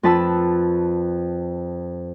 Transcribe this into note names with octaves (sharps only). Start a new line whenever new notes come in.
F2 B4 A5 B5 E6